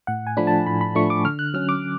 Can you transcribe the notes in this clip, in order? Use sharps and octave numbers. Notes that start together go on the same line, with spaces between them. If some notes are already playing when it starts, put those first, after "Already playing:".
A2 F#5
G#5
F3 A3 D4 B5
A5
A2 B5
B5
F3 A3 D4 C#6
D6
D3 F6
F#6
F#3 C#4 F6
D6